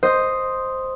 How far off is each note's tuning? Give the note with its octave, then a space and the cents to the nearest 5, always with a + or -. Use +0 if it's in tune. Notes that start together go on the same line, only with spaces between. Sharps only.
C5 +0 D#5 +0